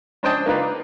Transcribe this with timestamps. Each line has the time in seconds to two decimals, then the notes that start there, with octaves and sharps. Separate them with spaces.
0.23 C#4 D4 C5 D#5 G5 A5
0.46 A#3 D4 D#4 F4 B4